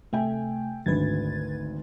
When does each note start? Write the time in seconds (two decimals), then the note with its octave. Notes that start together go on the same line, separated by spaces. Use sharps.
0.13 C3 A3 E5 G5 G#5
0.86 G#1 D2 B4 G#6 A6